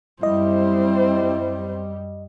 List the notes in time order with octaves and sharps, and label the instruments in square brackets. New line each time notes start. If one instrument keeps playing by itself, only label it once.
[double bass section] F#2 G3 [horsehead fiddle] C4 C5 [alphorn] E4 [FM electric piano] D#5